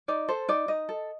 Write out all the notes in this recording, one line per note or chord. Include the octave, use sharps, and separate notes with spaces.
D#4 D5
A4 C5
D#4 D5
D#4 D#5
A4